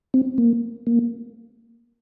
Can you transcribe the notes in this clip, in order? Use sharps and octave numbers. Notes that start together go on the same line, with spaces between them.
C4
A#3
A#3